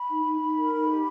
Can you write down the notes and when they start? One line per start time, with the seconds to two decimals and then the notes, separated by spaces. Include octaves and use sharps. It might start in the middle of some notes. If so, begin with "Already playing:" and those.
Already playing: B5
0.09 D#4
0.25 D#4
0.40 D#4
0.56 A#4
0.72 D#4
0.87 G4